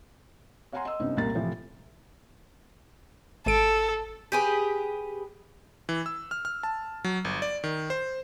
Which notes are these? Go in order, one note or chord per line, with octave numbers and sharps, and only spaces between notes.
C#5 F5 F#5 G#5 A#5 C6
D#5 C6 E6
G2 C3 B3 C#4 D#4
C2 A#2 A#3 A#5 A6
A2 C3 E3 F3
G#1 A4 D7
G4 G#4 B4
E3
E6
F6
F6
A5
F#3
G1
D5
D#3
C5